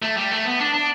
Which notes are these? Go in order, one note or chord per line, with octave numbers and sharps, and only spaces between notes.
A3
G3
A3
B3
D4
D4